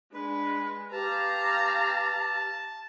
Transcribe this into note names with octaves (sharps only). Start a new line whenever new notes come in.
G#3 D4 B4
G4 B4 F5 A5 A#5